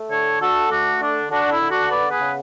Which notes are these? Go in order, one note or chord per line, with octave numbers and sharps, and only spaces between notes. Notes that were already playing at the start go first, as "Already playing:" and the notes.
Already playing: A3
D3 A4 C#5
D3 F#4 A4
A3 D4 F#4
D3 D4
D3 D4 F#4
E4
D3
D4 F#4
B3 B4 D5
G#4 B4
C#3